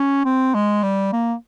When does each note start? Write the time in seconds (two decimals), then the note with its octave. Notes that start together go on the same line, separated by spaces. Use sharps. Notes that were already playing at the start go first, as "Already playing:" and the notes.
Already playing: C#4
0.25 C4
0.54 G#3
0.83 G3
1.13 A#3